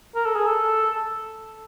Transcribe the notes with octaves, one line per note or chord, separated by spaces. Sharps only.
A#4
A4
G#4
A4